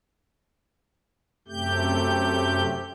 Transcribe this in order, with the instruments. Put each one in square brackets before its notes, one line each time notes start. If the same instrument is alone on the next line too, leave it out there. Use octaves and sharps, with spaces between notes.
[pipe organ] F#2 C3 A3 G4 G6